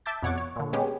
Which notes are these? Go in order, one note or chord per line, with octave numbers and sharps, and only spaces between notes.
E5 A5 D6 G6 A6
F2 B2 C#5 F#5 C#6 D6
C#5
A#2 D3
G#3 B3 C#4 G4 G#4